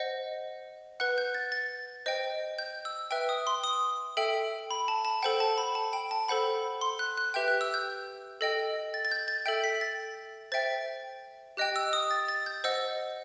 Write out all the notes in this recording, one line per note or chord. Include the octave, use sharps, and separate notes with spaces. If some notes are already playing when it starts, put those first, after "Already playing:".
Already playing: C5 D#5 F#5
B4 F#5 F#6
G6
A6
A6
C5 D#5 G5
G6
E6
B4 E5 G5 E6
D#6
C6
D#6
A4 E5 G5
B5
A5
A5
A4 C5 F#5 G5
A5
B5
A5
G5
A5
A4 C5 F#5 B5
C6
F#6
F#6
G4 B4 E5 G5 G6
F#6
E6
G6
A4 D#5 G5
A6
A6
G6
A6
A4 E5 G5 G6
B6
A6
C5 E5 G5 A6
G4 D#5 G5 F#6
E6
D#6
A6
A6
G6
C5 D#5 F#5 E6